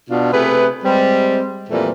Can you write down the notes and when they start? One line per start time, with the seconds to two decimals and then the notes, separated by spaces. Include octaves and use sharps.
0.10 B2 D4 F4
0.32 C3 A3 G#4 B4
0.84 G3 G#3 C4
1.70 F2 A#2 E3 G3 A3 C4